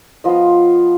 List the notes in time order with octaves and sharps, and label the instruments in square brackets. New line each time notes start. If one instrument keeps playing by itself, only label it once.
[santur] F3 B3 F4 D#5